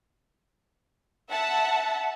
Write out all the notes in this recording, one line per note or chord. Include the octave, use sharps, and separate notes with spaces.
E5 F#5 A5